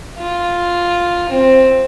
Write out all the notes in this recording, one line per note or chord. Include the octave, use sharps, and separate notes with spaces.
F4
C4